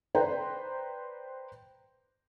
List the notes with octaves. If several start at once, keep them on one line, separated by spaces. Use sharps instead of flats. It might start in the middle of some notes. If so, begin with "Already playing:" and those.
B4 C5 D5 G5 A#5 C6